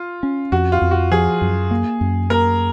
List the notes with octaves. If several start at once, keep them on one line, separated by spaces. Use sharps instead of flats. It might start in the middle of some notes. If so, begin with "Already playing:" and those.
Already playing: F4
C#4
F2 F#4
F4
F2
F#4
F3 G#4
F#2
A#3
F#2
A#3 A#4